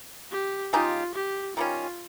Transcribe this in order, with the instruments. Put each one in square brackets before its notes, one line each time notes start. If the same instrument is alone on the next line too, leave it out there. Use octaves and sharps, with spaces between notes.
[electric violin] G4
[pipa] C#3 G#3 D#4 G4 [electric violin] F4
[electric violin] G4
[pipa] D#3 G3 C#4 [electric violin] F4